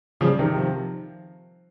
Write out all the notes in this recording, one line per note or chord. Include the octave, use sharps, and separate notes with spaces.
C#3 F3 G3
C3 D#3
F3